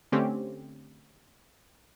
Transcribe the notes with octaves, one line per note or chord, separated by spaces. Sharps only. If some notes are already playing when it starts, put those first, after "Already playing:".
D3 A3 C4 C#4 G4